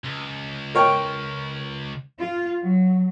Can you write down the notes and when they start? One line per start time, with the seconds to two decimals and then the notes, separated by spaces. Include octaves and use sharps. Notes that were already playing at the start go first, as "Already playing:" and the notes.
0.05 C#2
0.75 A#4 C#5 G5
2.21 F4
2.60 F#3